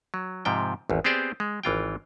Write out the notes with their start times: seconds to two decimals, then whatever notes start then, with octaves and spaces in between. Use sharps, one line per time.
0.14 F#3
0.45 G#2 C3 F3 G5
0.90 G#1 E2
1.04 B3 C4 G4 G#4 C5 D5
1.40 G#3
1.63 G#1 E3 F4 G5